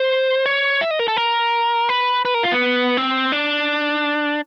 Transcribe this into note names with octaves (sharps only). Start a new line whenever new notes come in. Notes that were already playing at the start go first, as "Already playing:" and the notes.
Already playing: C5
C#5
E5
D#5
A#4
A4
A#4
B4
B4
A#4
F4
B3
C4
D4